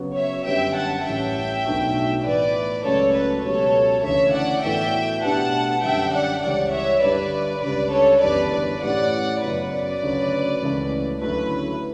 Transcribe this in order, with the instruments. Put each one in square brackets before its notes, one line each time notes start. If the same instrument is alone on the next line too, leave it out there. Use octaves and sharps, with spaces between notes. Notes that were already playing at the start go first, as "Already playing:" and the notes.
Already playing: [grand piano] C#3 F#3 B3 F#4
[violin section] C#5 E5
[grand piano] F#2 D3 G3 B3 [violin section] E5 G5
[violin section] F#5 A5
[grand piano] A1 A2 E3 G3 C#4 [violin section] E5 G5
[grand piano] B1 B2 A3 D4 F#4
[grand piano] A2 E3 B3 [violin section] B4 D5
[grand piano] C#2 C#3 F#3 A3 [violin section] A4 C#5
[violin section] B4
[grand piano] C#2 B2 F#3 C#4 G4 [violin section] A4 C#5
[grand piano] D2 C#3 E3 [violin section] C#5 E5
[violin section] D5 F#5
[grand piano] A2 E3 B3 F#4 A4 [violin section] E5 G5
[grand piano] B2 A3 D4 G4 B4 [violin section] F#5 A5
[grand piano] F#2 D3 G3 [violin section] E5 G5
[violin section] D5 F#5
[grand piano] C#2 C#3 E3 G3 C#4 [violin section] D5 F#5
[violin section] C#5 E5
[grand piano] G2 D3 G3 [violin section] B4 D5
[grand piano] C#2 C#3 G3 D4 [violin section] B4 D5
[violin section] A4 C#5
[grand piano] F#1 E2 D3 G3 [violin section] B4 D5
[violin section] B4 D5
[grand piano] A2 E3 A3 C#4 G4 [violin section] D5 F#5
[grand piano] F#2 C#3 F#3 B3 [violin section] B4
[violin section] B4 D5
[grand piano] D2 C#3 F#3 C#4
C#2 C#3 E3 A3 C#4
[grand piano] D2 C#3 F#3 A3 E4 [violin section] B4